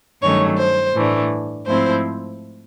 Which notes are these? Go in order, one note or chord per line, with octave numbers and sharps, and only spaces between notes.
G2 D#3 F#3 A3 C#4 C#5
C5
A2 E3 A3 D4
G#2 F3 A3 C4 E4 C5